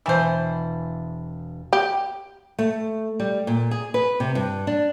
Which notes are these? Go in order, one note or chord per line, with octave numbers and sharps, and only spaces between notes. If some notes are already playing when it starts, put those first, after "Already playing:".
E1 E3 C5 A5 B5
G4
A3
G3
A#2
G#4
B4
C3
G2
D4